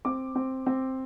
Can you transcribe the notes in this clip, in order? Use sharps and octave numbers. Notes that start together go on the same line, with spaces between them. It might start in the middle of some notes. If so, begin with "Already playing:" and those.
C4 D6
C4
C4